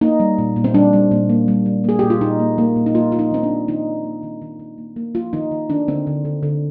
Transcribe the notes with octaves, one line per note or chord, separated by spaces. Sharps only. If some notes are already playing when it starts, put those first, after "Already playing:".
A#3 D#4
G3
A#2
A#2
C4
G3 D4
G3
A#2
A#3
G3
G3
A#3 G#4
A#2 G4
F4
A#2 D#4
A#3
A#3
A#2
D#4
A#3 F4
A#3 F4
D#4
D#3 C4
D4
D#3
D#3 D#4
A#3
A#3
D#3
D#3
D#3
A#3
A#3
A#3 F4
D#3 D#4
D#3
D#3 D4
D3 C4
D3
D3
D3